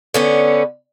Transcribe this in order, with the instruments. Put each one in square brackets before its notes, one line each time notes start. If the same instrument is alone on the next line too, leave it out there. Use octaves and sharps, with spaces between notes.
[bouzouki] D3 B3 C#4